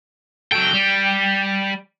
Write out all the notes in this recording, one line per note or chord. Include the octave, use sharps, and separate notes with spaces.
F#3 A4 G5
G3